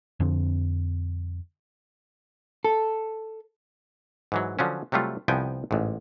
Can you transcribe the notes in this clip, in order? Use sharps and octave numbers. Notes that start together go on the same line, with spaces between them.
F2 D3 C4
A4
G#2 E3 F#3
D3 F3 F#3 C#4
C3 F#3 G3 A3 F4
C2 F3 B3 G5 G#5
A1 G#2